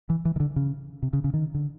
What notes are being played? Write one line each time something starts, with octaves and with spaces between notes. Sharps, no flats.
E3
E3
D#3
D3
C#3
C3
C#3
C#3
D#3
D3